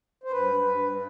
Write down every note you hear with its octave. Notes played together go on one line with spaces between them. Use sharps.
C5
G2 B4
G2
G2